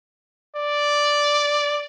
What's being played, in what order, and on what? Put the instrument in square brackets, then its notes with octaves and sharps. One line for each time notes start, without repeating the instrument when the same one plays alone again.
[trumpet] D5